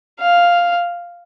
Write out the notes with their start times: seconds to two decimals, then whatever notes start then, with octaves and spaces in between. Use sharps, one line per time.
0.20 F5